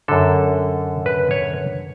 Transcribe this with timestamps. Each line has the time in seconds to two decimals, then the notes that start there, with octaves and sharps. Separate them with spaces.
0.08 F#2 D3 A4
1.06 B4
1.31 C#5